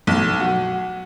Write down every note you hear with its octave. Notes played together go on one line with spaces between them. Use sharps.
B1
F#4